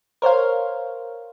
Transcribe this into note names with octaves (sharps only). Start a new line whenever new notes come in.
A#4 C5 C#5 F5